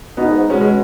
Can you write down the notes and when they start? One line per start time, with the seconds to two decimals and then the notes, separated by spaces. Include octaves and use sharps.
0.17 B2 B3 D#4
0.28 G#2
0.39 G#2
0.50 B2 G#3 C#4
0.60 G#3 C#4